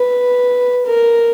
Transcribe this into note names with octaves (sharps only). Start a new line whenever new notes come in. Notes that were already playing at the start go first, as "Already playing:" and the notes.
Already playing: B4
A#4